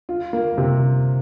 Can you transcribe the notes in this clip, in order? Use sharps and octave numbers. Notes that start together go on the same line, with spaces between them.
F4
A#3
C3